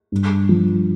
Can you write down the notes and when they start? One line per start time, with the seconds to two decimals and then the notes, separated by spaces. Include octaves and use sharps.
0.12 G2
0.49 F3